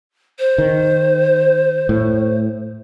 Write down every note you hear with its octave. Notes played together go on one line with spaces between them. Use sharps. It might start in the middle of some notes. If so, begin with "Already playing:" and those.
C5
D#3
A2